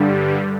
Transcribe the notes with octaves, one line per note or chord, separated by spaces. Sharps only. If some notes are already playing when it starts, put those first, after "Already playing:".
Already playing: G2 D3 G3